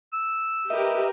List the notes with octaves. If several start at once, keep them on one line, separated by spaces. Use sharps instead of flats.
E6
G4 A#4 B4 D#5 E5